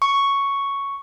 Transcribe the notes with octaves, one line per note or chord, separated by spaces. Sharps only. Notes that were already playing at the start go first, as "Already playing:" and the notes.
C#6